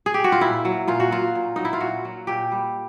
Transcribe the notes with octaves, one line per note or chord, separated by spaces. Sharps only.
G#4
G4
F#4
F4
A#2 E4
F#3
A#2 F4
F#4
F#3 F4
A#2
F#3 D#4
E4
F4
A#2 F#4
F#3
A#2 G4
G3